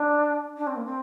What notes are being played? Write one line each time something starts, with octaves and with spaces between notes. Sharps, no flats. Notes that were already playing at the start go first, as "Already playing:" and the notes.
Already playing: D4
D4
C4
A#3
C4